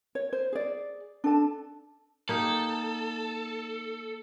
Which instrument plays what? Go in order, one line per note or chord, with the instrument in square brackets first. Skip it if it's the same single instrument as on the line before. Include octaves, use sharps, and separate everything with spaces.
[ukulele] C#5
C5
G#4 D5
D4 A4 A5
[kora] A#3 D#4 G4 [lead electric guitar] A4